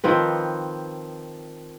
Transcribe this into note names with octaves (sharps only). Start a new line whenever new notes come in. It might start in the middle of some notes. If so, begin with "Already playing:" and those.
D#3 F3 C4 B4